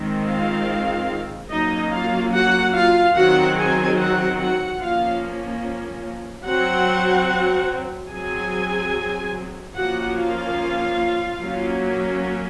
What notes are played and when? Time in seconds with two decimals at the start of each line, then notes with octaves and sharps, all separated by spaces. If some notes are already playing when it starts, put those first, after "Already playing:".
Already playing: D#3 G#3 C4
0.27 F4 F5
1.50 F#3 A#3 C#4 D#4 D#5
1.92 F4 F5
2.33 F#4 F#5
2.74 F4 F5
3.15 D#3 F#3 C4 F#4 F#5
3.57 G#4 G#5
3.98 F#4 F#5
4.40 F#4 F#5
4.80 F3 A#3 C#4 F4 F5
6.45 F#3 C4 F#4 F#5
8.10 F#3 C4 G#4 G#5
9.75 F3 A#3 C#4 F#4 F#5
10.16 F4 F5
11.40 F#3 A#3 C#4